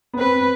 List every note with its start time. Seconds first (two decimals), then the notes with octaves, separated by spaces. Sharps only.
0.14 B3
0.18 C4 B4